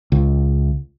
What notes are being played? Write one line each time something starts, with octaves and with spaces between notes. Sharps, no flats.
C#2